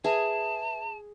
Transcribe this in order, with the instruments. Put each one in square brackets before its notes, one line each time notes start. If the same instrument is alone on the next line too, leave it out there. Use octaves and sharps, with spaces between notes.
[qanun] G#4 [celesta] B4 E5 [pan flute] A5